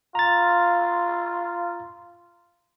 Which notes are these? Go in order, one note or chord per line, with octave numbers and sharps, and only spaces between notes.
F4 A#5 A6